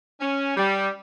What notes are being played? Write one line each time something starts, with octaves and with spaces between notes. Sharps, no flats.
C#4
G3